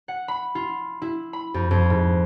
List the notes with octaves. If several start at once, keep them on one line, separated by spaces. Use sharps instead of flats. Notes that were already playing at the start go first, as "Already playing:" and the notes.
F#5
B5
F4
E4
B5
F2
F2
G#2